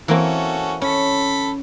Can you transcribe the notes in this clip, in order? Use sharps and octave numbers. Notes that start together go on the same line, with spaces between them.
E3 A#3 C4 C#4 F#4 A4
C#4 A4 B5